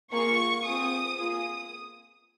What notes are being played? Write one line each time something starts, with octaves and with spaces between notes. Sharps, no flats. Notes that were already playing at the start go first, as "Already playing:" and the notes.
A#3 F4 G#4 C#6
C4 F4 G#4 D#6
A#3 F4 G#4 D#6